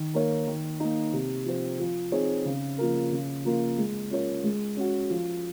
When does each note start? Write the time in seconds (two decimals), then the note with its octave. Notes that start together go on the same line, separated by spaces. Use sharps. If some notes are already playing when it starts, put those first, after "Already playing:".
Already playing: D#3
0.14 A#3 D#4 A#4 C#5
0.47 D#3
0.80 A#3 D#4
1.13 C3
1.46 F3 C4
1.79 F3
2.12 C4 D#4 G#4 C#5
2.45 C#3
2.78 F3 A#3 F4 A#4
3.11 C#3
3.44 F3 A#3 F4 A#4
3.78 G#3
4.11 C#4 F4 A#4 C#5
4.44 G#3
4.77 C#4 F#4
5.10 F3